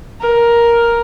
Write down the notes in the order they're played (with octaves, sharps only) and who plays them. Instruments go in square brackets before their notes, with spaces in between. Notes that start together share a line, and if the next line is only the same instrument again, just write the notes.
[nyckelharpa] A#4